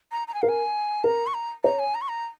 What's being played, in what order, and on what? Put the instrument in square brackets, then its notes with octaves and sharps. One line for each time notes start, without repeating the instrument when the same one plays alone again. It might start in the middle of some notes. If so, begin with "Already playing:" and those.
[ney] A#5
A#5
G#5
[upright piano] A#4 [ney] F5
[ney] G#5
[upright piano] A#4 [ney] A#5
[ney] C#6
A#5
[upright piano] C#5 [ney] A#5
[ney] G#5
A#5
C#6
A#5